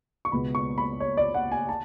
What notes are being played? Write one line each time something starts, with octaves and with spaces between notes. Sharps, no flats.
C#6
C#2 B2 G#3 B3 B5
C#6
B5
C#5
D5
F#5
G#5
A5